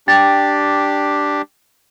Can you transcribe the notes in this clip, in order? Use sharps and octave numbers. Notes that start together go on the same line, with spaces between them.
D4 G4 G5 A6